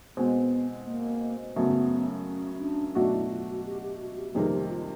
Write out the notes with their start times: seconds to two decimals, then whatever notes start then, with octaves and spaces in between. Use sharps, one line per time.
0.17 B2 G#3 B3 C4
0.86 A#3
1.55 F#2 C#3 F#3 A3 B3
2.26 C#4
2.60 D4
2.95 B2 F#3 A3 D4 D#4 F#4
3.13 E4
3.30 F4
3.48 F#4
3.66 G4
3.82 G4
4.00 F#4
4.17 G4
4.34 F2 C3 D#3 G3 A#3 G#4
4.53 G4
4.69 F4